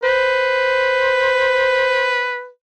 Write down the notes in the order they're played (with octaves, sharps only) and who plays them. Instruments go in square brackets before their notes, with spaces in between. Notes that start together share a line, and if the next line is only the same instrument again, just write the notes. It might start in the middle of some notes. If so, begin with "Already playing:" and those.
[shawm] B4 [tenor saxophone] C5